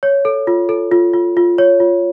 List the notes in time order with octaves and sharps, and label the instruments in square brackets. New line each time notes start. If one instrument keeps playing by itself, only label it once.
[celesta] C#5
A4
F4
A4
F4
F4
F4
C#5
F4